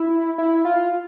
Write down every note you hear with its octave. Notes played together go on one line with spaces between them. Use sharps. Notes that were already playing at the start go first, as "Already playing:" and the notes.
Already playing: E4
E4
F4